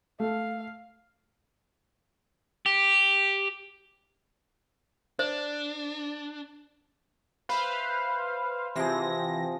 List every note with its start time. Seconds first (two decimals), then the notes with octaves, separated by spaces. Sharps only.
0.20 A3 F5
2.66 G4
5.19 D4 C5
7.49 B4 C5 E5 F5 B5
8.76 C3 E3 F3 C4 G#4 A#6